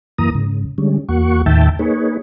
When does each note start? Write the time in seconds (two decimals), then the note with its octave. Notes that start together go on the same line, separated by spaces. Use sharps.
0.18 F#2 E3 A#3 A#5 D#6
0.35 G#2 C#3
0.78 D3 G3 G#3 C#4
1.09 E2 A#3 F#4 F#5 C#6
1.46 D#2 A2 D#3 E5 G5 A5
1.79 A#3 D#4 G#4 B4 C#5